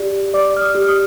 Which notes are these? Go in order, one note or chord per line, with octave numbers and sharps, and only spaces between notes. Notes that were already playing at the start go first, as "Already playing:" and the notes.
Already playing: G4 D5
D5 D6
F6
D#6
G4
F6
D#6